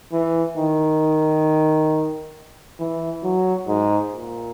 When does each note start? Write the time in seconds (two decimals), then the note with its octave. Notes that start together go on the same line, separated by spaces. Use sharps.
0.12 E3
0.57 D#3
2.79 E3
3.23 F#3
3.68 G#2
4.11 A#2